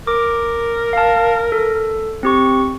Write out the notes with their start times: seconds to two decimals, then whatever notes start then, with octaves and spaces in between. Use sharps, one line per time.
0.07 A#4 D6
0.93 F5 A5
1.52 A4
2.23 C4 G4 C#6